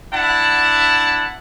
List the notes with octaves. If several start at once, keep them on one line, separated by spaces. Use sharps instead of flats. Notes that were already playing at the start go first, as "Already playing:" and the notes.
D4 E4 F#5 A5